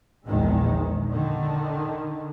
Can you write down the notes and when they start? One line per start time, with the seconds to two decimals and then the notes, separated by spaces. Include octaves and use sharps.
0.25 A#1 E2 D#3 G#3
1.10 D3 D#3